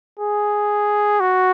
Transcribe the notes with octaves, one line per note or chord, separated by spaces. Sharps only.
G#4
F#4